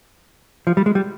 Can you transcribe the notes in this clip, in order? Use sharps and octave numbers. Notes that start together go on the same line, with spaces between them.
F3
G3
G#3
G3